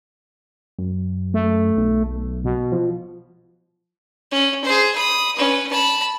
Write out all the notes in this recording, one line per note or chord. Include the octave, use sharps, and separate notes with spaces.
F#2
A3
B1
B2
F3
C#4
G#4 C5
B5 D#6
C#4 B4
A5 B5